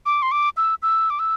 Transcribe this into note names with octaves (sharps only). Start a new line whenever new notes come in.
D6
C6
D6
E6
E6
D6
E6